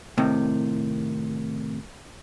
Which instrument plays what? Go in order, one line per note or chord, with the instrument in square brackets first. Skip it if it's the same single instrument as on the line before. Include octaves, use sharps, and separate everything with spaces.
[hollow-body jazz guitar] A2 C3 D#3